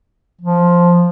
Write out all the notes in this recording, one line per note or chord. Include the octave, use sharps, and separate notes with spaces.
F3